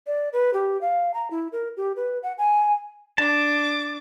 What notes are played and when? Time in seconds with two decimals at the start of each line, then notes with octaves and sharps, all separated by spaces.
0.07 D5
0.33 B4
0.54 G4
0.81 F5
1.14 A#5
1.31 E4
1.52 A#4
1.77 G4
1.96 B4
2.23 F#5
2.38 G#5
3.18 D4 A5 D6